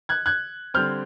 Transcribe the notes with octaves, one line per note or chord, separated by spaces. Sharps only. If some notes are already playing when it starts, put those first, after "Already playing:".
F#6 G#6
F#6 G#6
D3 G3 C4 F6 G6